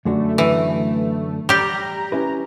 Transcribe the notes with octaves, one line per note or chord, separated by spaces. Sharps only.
F#2 D3 A3 F#4
E3
G3 G4 A#5
C#4 E4 B4